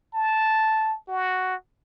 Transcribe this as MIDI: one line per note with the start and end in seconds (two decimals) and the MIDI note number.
0.14 0.97 81
1.08 1.55 66